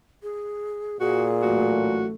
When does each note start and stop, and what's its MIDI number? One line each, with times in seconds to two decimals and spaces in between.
0.23 1.00 68
1.00 2.06 46
1.00 1.27 66
1.00 1.72 68
1.42 2.14 33
1.42 2.14 54
1.42 2.14 57
1.42 2.06 66